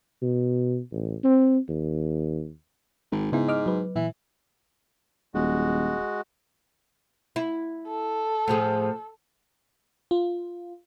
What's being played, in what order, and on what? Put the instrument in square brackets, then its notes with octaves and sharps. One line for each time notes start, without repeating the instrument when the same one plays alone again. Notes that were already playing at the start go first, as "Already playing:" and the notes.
[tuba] B2
A1
C4
D#2
[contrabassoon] G#1
[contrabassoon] G#2 [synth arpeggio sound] C#3 B3 E4
[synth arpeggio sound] D#5 D6 F6
F#3 B4
[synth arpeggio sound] A#2 [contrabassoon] E3
[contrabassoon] D#1 [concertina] G#3 F#4
[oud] E4
[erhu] A4
[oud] A2 F3 G#4
[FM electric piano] F4